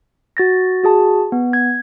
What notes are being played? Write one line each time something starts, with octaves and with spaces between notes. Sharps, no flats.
F#4 A6 A#6
F#4 G#4 A5
B3
G#6